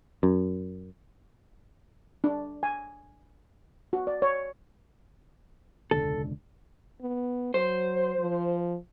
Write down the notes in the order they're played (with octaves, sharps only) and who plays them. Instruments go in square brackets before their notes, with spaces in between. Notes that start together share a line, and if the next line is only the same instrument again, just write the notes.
[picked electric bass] F#2
[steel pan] D4
G#5
F#4
D5
C#5
[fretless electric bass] E1 C#2 D3 [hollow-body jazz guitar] A4
[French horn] B3
[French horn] F#3 [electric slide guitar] C5
[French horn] F3